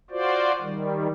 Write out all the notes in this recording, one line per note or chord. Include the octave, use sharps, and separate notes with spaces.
F4 F#4 C5 D5
D#3 G3